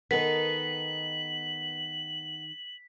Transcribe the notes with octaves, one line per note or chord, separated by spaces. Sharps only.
D#3 B3 D#4 A4 A#4 B6 F#7